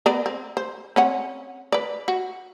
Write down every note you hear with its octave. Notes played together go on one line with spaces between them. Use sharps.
B3 A#4 D5
C4
C5
C4 C#4 F#5
B4 D5
F#4